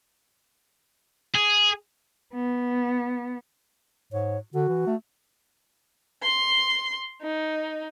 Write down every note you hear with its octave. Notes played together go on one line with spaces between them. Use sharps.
G#4
B3
G#2 C#5
D3 F#4
E3
A3
C6
D#4